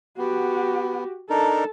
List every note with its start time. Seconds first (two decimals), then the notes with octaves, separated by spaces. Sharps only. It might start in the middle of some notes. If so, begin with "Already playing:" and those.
0.18 B3 F#4 G4
1.30 D4 D#4 A4 A#4